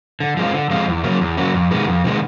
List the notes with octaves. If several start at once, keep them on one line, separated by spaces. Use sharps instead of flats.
D3
F3 G#3 C4 F4
D3
F3 G#3 C4 F4
E2
C#3 F#3 A#3 C#4
E2
C#3 F#3 A#3 C#4
F2
C3 D#3 G#3 B3
F2
C3 D#3 G#3 B3